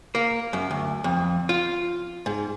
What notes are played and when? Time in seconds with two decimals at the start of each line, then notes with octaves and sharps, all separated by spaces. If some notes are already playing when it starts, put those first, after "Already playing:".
0.15 A#3
0.53 F#2
0.71 D2
1.04 F2
1.49 F4
2.26 G#2